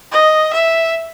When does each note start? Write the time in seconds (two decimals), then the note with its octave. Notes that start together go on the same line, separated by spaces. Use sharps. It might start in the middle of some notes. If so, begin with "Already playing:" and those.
0.12 D#5
0.53 E5